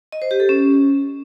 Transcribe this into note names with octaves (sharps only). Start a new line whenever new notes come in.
D#5
C5
G4
A4
C#4